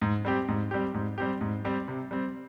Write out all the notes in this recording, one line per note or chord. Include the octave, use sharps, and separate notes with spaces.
G#2
G3 C4 G4
G#2
G3 C4 G4
G#2
G3 C4 G4
G#2
G3 C4 G4
C3
G3 C4